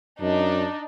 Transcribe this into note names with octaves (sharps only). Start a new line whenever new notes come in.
F#2 D4 D#4